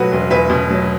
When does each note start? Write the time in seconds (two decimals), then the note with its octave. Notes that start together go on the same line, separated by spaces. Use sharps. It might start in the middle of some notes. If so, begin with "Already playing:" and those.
Already playing: B2 F#3 A3 F#4 B4
0.12 E1
0.30 E2 B4 E5
0.50 B2
0.70 F#3